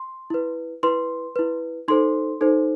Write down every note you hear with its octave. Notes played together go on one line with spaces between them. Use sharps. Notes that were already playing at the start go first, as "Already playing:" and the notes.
Already playing: C6
E4 B4
E4 B4 C6
E4 B4
D#4 A4 C5 C6
D#4 A4 C5